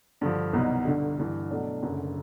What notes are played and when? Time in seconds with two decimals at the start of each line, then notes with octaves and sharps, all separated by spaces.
0.21 G2 D3 F3
0.53 C2 B2 F#3 B3 D#4
0.85 G1 G2 D3
1.19 G1 G2 E3
1.50 B2 F#3 A3 D4
1.83 F#1 F#2 D3